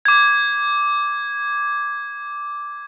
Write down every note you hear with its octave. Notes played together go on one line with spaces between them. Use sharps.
D6 G#6